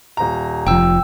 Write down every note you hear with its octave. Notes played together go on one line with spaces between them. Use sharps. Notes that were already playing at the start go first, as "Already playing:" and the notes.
D#1 A#5
F1 F3 G5 E6